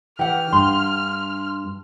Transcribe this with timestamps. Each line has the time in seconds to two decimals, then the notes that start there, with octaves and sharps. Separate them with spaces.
0.19 E3 G4 F#5 F6
0.53 G2 C6